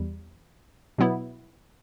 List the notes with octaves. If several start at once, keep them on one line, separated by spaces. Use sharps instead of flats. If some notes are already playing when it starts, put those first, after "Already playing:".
Already playing: E2 G3
B2 F#3 B3 E4